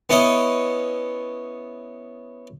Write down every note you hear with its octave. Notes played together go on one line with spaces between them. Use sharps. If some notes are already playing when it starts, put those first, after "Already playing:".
B3 C#4 E4 D#5